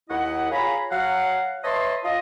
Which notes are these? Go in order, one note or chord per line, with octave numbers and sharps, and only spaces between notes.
D#2 E4 D#5 F#5
F4 G#4 C#5 F5 A#5 B5
F#3 F5 F#5
B4 C#5 D#5 E5 A5 C6
F4 D#5